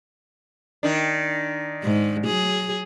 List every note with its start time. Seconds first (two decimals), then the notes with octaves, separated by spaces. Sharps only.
0.83 D#3 D4
1.83 G#2
2.26 F#3 G#4